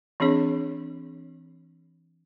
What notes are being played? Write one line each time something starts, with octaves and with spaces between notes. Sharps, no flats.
E3 C4 D4 G#4 C#5